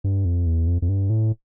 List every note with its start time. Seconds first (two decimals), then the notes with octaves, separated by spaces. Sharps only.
0.04 G2
0.25 F2
0.46 E2
0.67 F2
0.82 F2
0.89 G2
1.10 A2